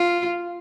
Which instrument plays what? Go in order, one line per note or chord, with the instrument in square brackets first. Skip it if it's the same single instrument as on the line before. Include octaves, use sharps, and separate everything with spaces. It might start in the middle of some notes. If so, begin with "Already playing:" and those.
Already playing: [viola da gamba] F4